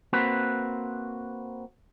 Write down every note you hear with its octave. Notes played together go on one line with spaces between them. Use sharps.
A#3 C4 F#4 B4